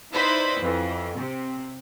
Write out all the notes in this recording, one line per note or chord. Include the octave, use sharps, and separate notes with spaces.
D#4 E4 B4 C5 D5 B5
F2 E3
C3 C4